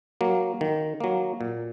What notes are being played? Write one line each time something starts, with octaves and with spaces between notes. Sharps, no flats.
F#3 A#3
D#3
F#3 A#3
A#2